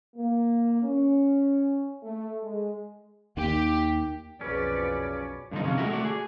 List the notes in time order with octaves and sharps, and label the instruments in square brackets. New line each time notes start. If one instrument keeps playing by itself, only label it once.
[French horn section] A#3
C#4
A3
G#3
[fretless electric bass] D#2 D#3 [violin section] G4
[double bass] B1 F2 [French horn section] F3 F#3 G#4 [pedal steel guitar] C#4 [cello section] B4 D5
[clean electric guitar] G2 D3 F3 D#4
C3 F3 F#3 C#4
G#3 A3 E4 F#4 A#4
A3 F#4 D5
G#4